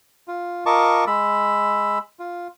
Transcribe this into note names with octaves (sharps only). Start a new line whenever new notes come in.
F4
F4 A#4 D#5 A5 C#6 D6
G#3 B5 E6
F4